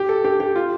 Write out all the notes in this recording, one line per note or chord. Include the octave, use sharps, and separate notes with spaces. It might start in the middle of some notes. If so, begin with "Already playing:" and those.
Already playing: G4
A4
G4
G4
F4